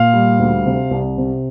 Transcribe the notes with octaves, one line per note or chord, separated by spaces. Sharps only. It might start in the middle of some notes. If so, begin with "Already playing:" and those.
Already playing: A#2 F5
G3
D2
C3
C2
C3